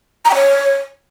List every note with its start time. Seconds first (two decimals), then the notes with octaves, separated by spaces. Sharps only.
0.25 A#5
0.30 G5
0.35 C#5